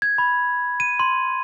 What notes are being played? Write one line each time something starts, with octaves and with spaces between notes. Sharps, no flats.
G#6
B5
D#7
C6